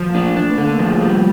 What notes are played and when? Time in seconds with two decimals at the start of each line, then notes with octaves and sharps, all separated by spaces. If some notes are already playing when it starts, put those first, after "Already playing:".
Already playing: F3
0.09 A#3
0.14 A3 D4
0.36 A3 D4
0.49 B3
0.58 D3 A#3
0.73 A3
0.79 F3
0.87 G#3
1.01 G3